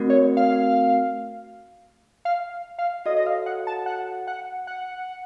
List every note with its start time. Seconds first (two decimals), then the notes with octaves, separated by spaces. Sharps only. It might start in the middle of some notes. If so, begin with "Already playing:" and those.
Already playing: A3 C4 F#4 A#4
0.10 C#5
0.37 F5
2.25 F5
2.79 F5
3.06 F#4 A4 C#5 D#5
3.16 D#5
3.27 F5
3.46 F#5
3.67 A5
3.86 F#5
4.27 F#5
4.67 F#5